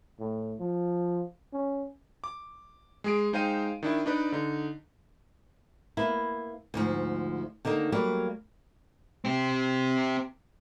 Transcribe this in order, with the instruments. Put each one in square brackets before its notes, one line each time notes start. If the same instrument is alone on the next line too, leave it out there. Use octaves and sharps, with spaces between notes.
[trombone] A2
F3
C#4
[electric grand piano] D6
G#3 G#4 D7
G#3 D#4 C5 F5 G5 D#7
D#3 D4 E4
D4 D#4 B4 D5
D3 D#4
[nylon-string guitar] A#3 B3 E4
D2 G#2 F3
D3 D#3 A#3 D#4
F#3 G3 A#3
[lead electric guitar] C4 G4